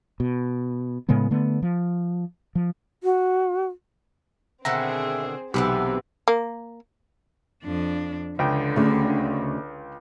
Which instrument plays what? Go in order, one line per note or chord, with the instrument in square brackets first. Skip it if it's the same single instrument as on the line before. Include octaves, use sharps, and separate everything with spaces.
[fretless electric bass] B2
A2 C#3 G#3 B3
D3 A3 B3
F3
F3
[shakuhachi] F#4
[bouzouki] B2 D3 D#3 [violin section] C4 G#4 C5 [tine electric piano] E5 [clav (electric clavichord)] A#5
[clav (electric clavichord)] B1 [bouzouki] C3 D#3 E3 [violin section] B3 C4 [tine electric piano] G4 B5
[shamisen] A#3
[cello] F2 D4
[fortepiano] C#2 G5 [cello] D3
[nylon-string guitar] D2 C#3